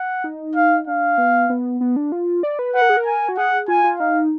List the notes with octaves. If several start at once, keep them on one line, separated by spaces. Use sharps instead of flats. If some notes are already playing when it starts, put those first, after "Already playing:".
Already playing: F#5
D#4
F5
D4 F5
B3
B3
B3
D4
F4
D5
B4
B4 F#5
A#4
G#4
A#4
G#5
F#4
G#4 F#5
F4 G#5
F4
D#4 F5